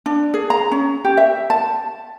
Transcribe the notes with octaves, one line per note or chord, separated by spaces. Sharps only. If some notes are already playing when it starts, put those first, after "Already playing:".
D4
G#4
A#5
C#4
G4
E5
A5